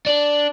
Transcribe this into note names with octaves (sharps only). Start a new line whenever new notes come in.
D4